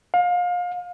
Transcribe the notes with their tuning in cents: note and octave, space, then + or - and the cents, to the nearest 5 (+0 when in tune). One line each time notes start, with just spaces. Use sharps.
F5 +30